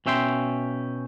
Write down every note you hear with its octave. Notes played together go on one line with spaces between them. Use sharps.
B2 C#4 E5 G5 C6